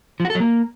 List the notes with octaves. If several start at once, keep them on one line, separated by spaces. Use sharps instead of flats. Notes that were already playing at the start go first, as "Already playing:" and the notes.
F3
F#4
A4
F#3
A#3